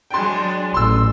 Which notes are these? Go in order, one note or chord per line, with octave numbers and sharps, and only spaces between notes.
F#3 G#3 D4 G5 C6
A1 C6 E6